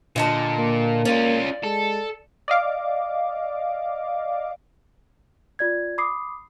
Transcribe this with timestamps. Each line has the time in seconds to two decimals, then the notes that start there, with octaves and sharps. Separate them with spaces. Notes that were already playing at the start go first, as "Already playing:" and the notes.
0.16 A#2 D3 D#5 A5
0.59 A#3
1.05 C#4 F4 D5
1.63 G#3 A4
2.48 D5 D#5 F5 D6
5.59 F4 D5 G#6
5.98 B5 D6 D#6 C7